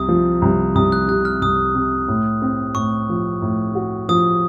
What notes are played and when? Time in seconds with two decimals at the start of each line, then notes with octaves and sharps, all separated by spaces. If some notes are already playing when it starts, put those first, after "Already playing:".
Already playing: C2 C3 D#6
0.08 F3
0.42 C2
0.75 C2 D#6
0.92 F#6
1.08 C3 F#6
1.25 F6
1.41 C2 D#6
1.75 C3
2.08 A2
2.42 C4
2.75 A2 C#6
3.09 F3
3.42 A2
3.75 F#4
4.09 F3 D#6